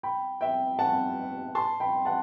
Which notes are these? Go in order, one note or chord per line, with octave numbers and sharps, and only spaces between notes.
G5 B5
E5 G5
F#5 A5
A5 C6
G5 B5
F#5 A5